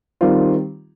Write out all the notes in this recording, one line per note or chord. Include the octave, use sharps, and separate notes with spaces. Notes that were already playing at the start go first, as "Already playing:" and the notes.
D#3 G3 C4 F4